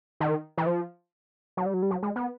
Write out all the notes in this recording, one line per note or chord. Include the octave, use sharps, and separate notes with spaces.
D#3
E3
F3
F#3
G3
F#3
G3
F#3
G#3
B3